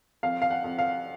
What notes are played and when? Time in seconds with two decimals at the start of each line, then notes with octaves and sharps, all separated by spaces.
0.23 F2 F5
0.42 F5
0.51 F#5
0.64 F2
0.78 F5